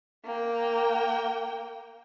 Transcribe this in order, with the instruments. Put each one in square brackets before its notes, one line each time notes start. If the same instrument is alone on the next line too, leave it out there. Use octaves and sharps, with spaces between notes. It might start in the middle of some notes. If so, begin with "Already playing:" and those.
[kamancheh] A#3 G5